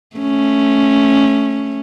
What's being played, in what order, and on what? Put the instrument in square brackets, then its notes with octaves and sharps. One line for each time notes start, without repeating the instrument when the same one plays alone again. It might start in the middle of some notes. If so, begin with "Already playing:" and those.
[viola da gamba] A3 C#4